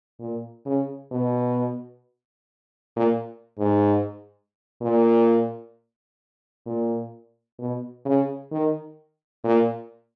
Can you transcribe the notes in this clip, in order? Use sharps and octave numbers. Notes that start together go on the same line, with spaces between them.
A#2
C#3
B2
A#2
G#2
A#2
A#2
B2
C#3
D#3
A#2